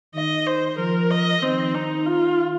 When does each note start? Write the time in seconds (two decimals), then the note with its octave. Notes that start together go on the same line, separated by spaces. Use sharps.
0.15 D#3 D#5
0.47 C5
0.78 F3 A#4
1.11 D#5
1.42 D#3 C4
1.75 D#4
2.07 F4